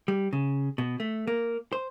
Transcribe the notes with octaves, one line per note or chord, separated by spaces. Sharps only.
G3
C#3
B2
A3
A#3
C5